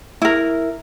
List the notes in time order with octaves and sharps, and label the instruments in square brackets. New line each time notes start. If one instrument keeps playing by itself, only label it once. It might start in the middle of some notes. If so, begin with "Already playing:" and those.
[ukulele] E4 A#4